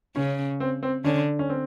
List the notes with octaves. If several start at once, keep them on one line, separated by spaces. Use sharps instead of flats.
C#3 C#4
C4
C4
D3 C#4
C#4
C4